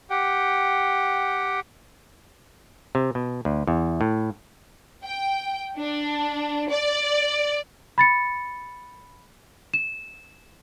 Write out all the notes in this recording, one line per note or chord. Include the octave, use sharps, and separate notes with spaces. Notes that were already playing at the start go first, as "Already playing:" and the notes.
G4 F#5 G5
C3
B2
D2
E2
A2
G5
D4
D5
B5 A6 C#7
E7